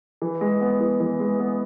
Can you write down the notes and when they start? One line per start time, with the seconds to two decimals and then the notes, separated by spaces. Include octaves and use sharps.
0.22 E3
0.41 G#3
0.61 B3
0.80 E3
1.00 E3
1.20 G#3
1.40 B3